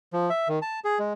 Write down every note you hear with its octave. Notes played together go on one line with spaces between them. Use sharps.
F3
E5
D#3
A5
G#4
G#3